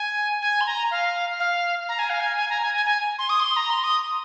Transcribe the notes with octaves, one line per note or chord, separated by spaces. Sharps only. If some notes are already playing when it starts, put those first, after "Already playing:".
Already playing: G#5
G#5
C6
A#5
F5
F5
A#5
G#5
F5
G#5
G#5
A#5
G#5
G#5
G#5
C6
D#6
C6
A#5
C6
D#6